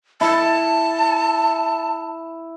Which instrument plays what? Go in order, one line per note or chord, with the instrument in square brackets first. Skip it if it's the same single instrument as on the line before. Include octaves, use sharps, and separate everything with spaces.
[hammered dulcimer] E4 [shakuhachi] A5